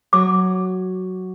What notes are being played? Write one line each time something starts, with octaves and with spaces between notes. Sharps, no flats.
F#3 D6